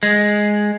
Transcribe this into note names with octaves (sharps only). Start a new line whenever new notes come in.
G#3